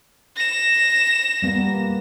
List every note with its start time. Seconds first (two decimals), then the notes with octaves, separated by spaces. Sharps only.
0.36 A#6 E7
1.42 G3 A#3 B3